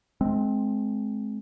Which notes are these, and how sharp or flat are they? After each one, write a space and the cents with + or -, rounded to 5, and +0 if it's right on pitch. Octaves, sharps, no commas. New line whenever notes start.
G#3 +30 C4 +0